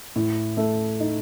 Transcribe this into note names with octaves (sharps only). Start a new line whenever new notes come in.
A2
A3
D#4